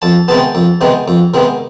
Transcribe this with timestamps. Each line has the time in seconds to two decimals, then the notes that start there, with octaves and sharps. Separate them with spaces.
0.02 F2 A5
0.28 C3 D#3 G#3 B3 A5
0.55 F2
0.81 C3 D#3 G#3 B3
1.08 F2
1.34 C3 D#3 G#3 B3